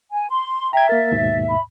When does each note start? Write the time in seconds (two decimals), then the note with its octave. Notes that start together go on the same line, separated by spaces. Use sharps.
0.12 G#5
0.29 C6
0.73 E5 G5 A#5 G#6
0.89 A#3 A#4 A6
1.12 D#2 G#2 B2
1.49 B5